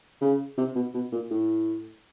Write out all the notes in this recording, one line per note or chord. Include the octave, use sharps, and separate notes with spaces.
C#3
C3
B2
B2
A#2
A2